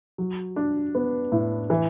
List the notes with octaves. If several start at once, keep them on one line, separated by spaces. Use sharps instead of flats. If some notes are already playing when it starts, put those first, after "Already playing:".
F#3
D4
B3
A2
E3